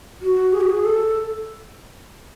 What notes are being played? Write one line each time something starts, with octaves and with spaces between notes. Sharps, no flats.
F#4
G#4
F#4
G#4
A4